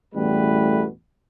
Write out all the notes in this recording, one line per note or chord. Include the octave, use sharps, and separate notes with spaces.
A1 E2 B2 G3 A3 B4